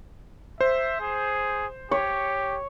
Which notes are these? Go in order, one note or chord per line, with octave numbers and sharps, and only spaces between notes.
C5 E5
G#4
G4 C#5